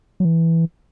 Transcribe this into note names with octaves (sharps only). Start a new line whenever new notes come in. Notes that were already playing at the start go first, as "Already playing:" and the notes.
F#3
E3